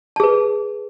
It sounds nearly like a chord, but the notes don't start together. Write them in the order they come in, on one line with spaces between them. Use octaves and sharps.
A5 G#4 B4